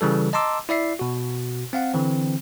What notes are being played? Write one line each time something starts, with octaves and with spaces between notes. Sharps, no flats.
C#3 E3 G3 A4
D#5 A5 A#5 C6 D6 E6
E4 D5 E5 C7
B2 F#4
C4 F5 F#5
D3 E3 C4